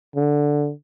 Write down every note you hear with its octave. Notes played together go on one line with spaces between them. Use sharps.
D3